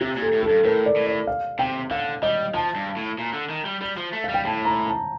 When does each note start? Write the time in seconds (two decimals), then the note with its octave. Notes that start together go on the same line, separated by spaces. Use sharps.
0.01 C3 G4
0.16 A#2
0.22 A4
0.33 A2
0.43 A4
0.49 G2
0.64 A2 A#4
0.86 D5
0.96 A2
1.07 D5
1.27 F5
1.59 C3 G5
1.91 D3 F5
2.23 G3 D#5
2.54 F3 A5
2.75 G2
2.96 A2
3.18 A#2
3.33 D3
3.49 D#3
3.65 G3
3.81 G3
3.97 F3
4.13 A3
4.24 G3 F5
4.34 G5
4.45 A2 A5
4.65 A#5
4.87 A5